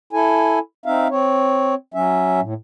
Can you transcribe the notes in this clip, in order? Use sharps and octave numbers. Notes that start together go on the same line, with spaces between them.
E4 A4 G#5
C4 D#4 E5 F5
C4 C#5
F#3 C#4 E5
A2